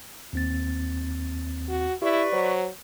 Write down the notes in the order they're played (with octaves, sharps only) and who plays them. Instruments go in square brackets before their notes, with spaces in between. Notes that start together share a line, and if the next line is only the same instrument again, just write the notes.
[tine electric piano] D#2 C4 A6
[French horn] F#4
[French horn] E4 [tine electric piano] G4 [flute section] B4 D5 C#6
[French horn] F#3 [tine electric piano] C5